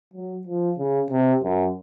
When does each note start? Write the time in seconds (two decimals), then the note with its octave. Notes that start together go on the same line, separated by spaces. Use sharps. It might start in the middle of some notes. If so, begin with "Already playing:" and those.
0.14 F#3
0.47 F3
0.78 C#3
1.11 C3
1.44 F#2